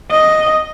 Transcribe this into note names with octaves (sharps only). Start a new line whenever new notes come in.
D#5